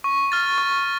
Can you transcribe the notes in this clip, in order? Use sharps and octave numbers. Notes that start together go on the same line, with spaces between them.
C#6
F6 A6
C#6